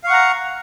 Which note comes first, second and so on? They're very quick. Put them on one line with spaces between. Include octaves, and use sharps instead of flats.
F5 C#6 F#5 A#5